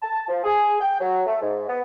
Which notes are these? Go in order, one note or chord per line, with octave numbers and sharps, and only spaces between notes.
A5
F3
G#4
G5
F#3
A3
G#2
B3